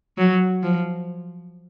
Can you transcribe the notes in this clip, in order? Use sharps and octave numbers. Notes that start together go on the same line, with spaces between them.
F#3
F3